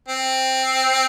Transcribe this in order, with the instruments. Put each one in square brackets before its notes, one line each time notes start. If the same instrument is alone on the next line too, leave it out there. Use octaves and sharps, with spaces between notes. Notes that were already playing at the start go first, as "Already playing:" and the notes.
[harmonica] C4